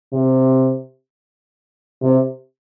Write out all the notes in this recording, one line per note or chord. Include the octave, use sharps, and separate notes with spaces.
C3
C3